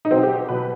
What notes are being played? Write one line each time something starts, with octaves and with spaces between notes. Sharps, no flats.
D#4
B2 F#3 C4
G4
B2 F#3 B4